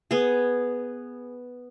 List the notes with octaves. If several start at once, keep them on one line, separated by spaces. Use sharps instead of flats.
B3 G#4